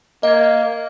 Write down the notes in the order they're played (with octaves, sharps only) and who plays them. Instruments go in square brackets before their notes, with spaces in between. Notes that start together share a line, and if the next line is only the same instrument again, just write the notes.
[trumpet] A#3 [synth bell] D#5 G#6